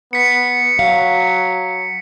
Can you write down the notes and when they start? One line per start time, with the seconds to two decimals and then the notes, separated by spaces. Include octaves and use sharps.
0.13 B3 B6 C#7
0.79 F#3 F5